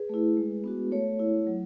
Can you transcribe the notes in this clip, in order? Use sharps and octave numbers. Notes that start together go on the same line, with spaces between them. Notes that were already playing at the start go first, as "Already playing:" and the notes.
Already playing: G#4 B4
A3 E4
G#3
B3 D4 F#4
A3 A4 C#5
E4
F#3